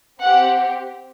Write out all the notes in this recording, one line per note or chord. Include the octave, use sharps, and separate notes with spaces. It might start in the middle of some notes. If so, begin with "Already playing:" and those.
C4 G4 F#5